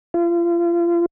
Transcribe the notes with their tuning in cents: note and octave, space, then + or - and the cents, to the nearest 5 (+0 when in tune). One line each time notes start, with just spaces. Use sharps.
F4 -35